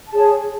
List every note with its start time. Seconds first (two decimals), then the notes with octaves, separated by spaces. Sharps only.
0.09 A5
0.12 G#4
0.16 C#5